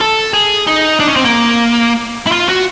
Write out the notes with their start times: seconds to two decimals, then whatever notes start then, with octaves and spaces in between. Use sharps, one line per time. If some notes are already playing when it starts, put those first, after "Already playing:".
0.01 A4
0.34 G#4
0.67 D#4
1.00 D4
1.08 C#4
1.16 C4
1.25 A#3
2.27 E4
2.32 F4
2.49 F#4